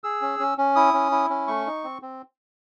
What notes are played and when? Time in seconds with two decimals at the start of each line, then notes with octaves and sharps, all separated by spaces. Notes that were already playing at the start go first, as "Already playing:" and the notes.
0.04 G#4 E6
0.22 C#4
0.39 C#4
0.58 C#4
0.76 E4 D#6
0.94 C#4
1.12 E4
1.30 C#4
1.48 A3 C#6
1.66 D#4
1.84 C4
2.02 C4